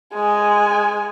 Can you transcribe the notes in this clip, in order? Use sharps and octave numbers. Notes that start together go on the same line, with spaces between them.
G#3 G#5